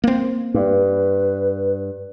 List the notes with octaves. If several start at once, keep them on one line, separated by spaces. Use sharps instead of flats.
A#3 C4
G2 B4